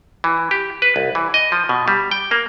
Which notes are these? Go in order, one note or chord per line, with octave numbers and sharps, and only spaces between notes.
E3
G4
B4
C2
E3
D#5
F3
B2
G3
G5
A#3